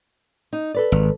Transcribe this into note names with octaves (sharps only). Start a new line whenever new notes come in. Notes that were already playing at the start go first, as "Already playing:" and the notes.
D#4
A4 B4 D5
G#1